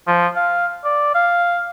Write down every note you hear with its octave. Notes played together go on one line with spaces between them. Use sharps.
F3
F5
D5
F5